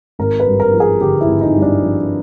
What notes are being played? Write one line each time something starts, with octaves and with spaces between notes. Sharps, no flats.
G#1 A#4
B4
G2
A#4
F3
G#4
D3 G4
E4
G#1
D#4
G2
D4
F3